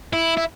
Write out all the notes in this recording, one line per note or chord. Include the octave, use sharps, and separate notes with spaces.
E4
E4